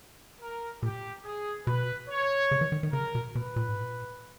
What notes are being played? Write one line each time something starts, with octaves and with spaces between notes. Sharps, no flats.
A#4
A#2 G4
G#4
B2 B4
C#5
C#3
E3
D#3
D#3
C#3 A#4
B2
B2 B4
A#2
G#2
A#2